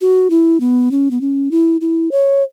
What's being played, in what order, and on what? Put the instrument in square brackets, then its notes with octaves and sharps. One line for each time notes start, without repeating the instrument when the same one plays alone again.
[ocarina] F#4
E4
B3
C#4
B3
C#4
E4
E4
C#5